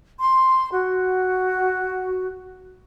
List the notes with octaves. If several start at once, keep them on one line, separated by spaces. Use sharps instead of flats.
C6
F#4